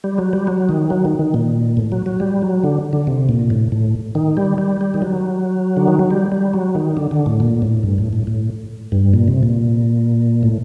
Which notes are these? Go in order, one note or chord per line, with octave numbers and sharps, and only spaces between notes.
G3
F#3
G3
F#3
D#3
F#3
D#3
D#3
A#2
A2
F#3
F#3
G3
F#3
D3
D3
C3
A#2
A2
A2
D#3
G3
G3
G3
D#3
F#3
D3
D#3
F#3
G3
G3
F#3
D#3
D3
D3
A2
A#2
A2
G2
A2
A2
A2
G2
A#2
C3
A#2
A2